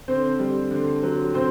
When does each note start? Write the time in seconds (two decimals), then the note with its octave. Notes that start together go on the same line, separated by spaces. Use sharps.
0.08 D3 C4 C5
0.39 G3
0.71 D3
1.03 F#3
1.34 C3 C4 C5